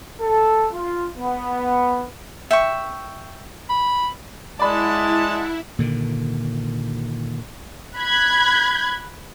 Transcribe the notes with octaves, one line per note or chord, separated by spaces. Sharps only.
A4
F4
B3
E5 G5 C#6
B5
G#3 E4 D5 F#5 A5 B5
A#2 D3 D#3
B5 F#6 G#6